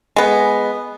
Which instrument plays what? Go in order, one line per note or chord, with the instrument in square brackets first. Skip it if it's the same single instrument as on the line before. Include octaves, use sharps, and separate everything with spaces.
[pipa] G#3 B3